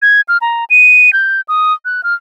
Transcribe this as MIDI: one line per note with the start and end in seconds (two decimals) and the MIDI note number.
0.02 0.21 92
0.28 0.38 89
0.41 0.65 82
0.70 1.13 99
1.13 1.41 91
1.48 1.73 87
1.85 2.01 90
2.04 2.14 89